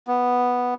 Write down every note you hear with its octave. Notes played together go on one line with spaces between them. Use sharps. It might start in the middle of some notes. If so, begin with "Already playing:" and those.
B3